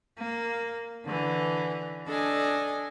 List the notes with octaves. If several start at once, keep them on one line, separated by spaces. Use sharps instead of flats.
A#3
D3 E3
D4 A4 D#5 G#5